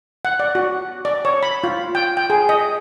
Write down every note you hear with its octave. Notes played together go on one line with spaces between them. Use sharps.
F#5
D5
F#4
D5
C#5
B5
F4
G5
G5
G#4
D#5